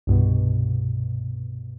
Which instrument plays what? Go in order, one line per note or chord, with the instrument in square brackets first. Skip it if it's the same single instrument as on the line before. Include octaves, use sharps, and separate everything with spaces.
[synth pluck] C2 G2 B2